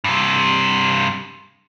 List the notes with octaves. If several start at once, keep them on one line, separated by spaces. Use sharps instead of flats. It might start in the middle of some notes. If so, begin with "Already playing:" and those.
G2 C3